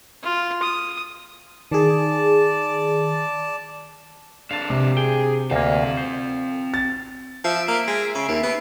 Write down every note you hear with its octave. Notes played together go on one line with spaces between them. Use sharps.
F4
D#6
D#3 G#4 D5 A5
F2 D4 F5 A5
C3
G#4 G5
D2 A#3 C4 F5
C5
A6
F3 E5 C7 D7
A#3
G#3
C#3
D#2
B3